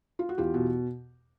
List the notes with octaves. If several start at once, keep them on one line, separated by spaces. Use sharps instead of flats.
F4
F#4
E2 F4 G4
B2